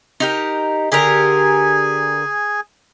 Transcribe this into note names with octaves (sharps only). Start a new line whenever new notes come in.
D#4 G4 A#4
D3 G4 G#4 A#4 G#5